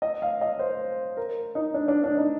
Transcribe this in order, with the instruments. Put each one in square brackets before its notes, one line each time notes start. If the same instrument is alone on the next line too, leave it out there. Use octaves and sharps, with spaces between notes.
[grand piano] D#5
F5
D#5
C5
A#4
D#4
D4
D4
D4
D#4